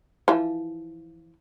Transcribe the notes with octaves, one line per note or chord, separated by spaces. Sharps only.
E3 F3